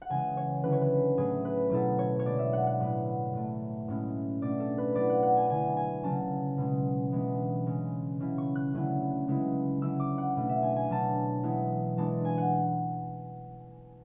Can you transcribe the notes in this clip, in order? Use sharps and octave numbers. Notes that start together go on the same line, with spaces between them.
F#5
C#3 E3 G#3 G#5
C#5
D3 F#3 C#4 E4 B4
C#5
B4
A2 F#3 A3 G#4
B4
B2 F#3 B3 E4 A4
C#5
C#5
D3 G#3 B3 D5
E5
F#5
F#5
A2 F#3 B3 E4
A2 F#3 A3
A2 G#3 C#4 E4
B2 A3 D4 D5
A4
B4
F#3 B3 E4 D5
F#5
F#5
G#5
D3 A3 E4 G#5
G#5
C#3 F#3 C#4 A5
B2 G#3 C#4
E3 G#3 B3 D4
C#3 G#3 C#4
C#3 F#3 C#4 E4
C#6
F#6
D3 F#3 A3 C#4 E4
C#3 G#3 B3 E4
D3 F#3 C#4 E4 E6
D6
F#5
B2 A3 D4
E5
G#5
G#5
B2 F#3 B3 D4 A5
E3 G#3 B3 E4
E3 G#3 D4 A5
G#5
F#5